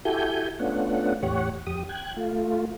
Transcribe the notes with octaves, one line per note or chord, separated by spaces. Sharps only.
E4 F#4 G4 A4 G#5 G6
A3 B3 C#4 D4 F4 F#5
E2 A2 G4 C#5 F#5
F2 G4 D#6
G5 F#6 G#6
A3 F4